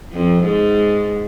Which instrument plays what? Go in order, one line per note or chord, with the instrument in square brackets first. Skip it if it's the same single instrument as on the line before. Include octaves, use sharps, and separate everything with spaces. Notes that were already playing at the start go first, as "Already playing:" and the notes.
[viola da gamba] F2
G#2